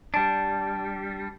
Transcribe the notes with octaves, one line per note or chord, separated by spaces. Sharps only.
G3 D4